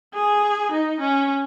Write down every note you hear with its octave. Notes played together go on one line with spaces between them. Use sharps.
G#4
D#4
C#4